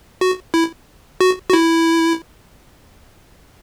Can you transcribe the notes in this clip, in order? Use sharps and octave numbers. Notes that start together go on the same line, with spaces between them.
F#4
E4
F#4
F#4
E4